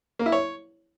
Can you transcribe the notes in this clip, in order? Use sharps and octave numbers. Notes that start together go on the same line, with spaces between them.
A#3
E4
C#5